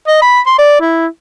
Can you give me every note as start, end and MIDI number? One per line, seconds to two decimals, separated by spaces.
0.07 0.17 75
0.22 0.40 83
0.46 0.57 84
0.58 0.79 74
0.81 1.06 64